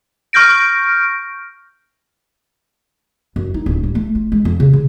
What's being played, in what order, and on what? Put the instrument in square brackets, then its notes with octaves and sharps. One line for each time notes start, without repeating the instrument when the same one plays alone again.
[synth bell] C#6 F6 G6 A#6 D7
[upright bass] F#2
D#4
D1
G3
A3
F4
G#3
F2
C#3
C#3